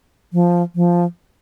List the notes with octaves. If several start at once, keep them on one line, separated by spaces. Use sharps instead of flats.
F3
F3